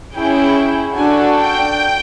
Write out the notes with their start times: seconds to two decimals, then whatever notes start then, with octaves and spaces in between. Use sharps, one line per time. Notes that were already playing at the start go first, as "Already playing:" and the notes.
0.15 C#4 E4 G#4 G5
0.96 D4 F#4 A4 G#5
1.37 G5